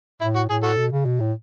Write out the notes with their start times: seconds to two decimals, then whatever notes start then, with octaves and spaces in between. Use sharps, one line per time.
0.21 A2 E4
0.36 F#4
0.49 A2 G#4
0.63 F#4 A4
0.77 B2
0.92 C#3
1.05 B2
1.20 A2